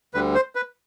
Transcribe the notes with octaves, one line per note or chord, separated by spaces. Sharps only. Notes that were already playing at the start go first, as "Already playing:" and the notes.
D2 D3 G3 B4
C5
B4